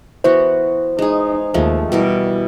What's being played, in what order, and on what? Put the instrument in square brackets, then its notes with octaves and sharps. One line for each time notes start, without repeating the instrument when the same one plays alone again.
[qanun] E3 B3 F#4 [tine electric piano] C5
[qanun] G#3 G#4 [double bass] D#4
[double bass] D#2 [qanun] F3 G#3 A3
[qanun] B2 E3 A#4 [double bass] G3